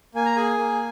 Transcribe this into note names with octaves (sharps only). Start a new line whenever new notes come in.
A#3 G#5
A#5
G#4 G#5
A#3